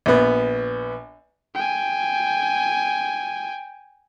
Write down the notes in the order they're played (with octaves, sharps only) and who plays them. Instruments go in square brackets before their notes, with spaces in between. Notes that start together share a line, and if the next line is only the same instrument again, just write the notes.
[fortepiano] A#1 B3
[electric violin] G5 G#5